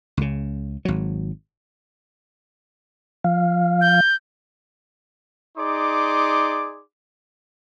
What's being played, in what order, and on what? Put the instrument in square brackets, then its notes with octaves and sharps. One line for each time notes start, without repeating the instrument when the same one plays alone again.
[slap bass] C#2 C#3
G#1 F#3
[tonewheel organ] F3 F5
[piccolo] G6
[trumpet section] D#4 G#4 D5 C6 D6